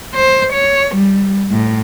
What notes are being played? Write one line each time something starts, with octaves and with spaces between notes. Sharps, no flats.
C5
C#5
G3
A2